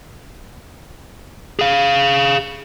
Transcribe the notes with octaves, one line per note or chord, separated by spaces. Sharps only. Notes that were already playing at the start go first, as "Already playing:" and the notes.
G#4 F5